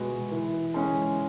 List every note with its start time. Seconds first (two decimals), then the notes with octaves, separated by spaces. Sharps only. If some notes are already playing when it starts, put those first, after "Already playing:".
Already playing: B2 G#3 B3 F#4
0.31 E3
0.74 G#3 C#4 G#4